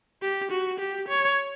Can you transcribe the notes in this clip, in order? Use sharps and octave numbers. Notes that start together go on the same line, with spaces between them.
G4
F#4
G4
C#5